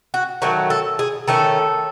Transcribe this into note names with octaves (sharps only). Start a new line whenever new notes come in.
F#4
D#3 F#3 A3 F#4
A4
G#4
D#3 A3 C#4 A4